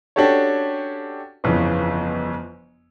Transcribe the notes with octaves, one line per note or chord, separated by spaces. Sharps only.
C#4 D4 F#4 G4 A4 C#5
G1 F2 C#3 E3